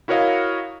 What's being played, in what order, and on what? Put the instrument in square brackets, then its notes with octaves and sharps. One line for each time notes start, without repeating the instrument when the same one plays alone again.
[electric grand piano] E4 F#4 A#4 C#5 D#5 F5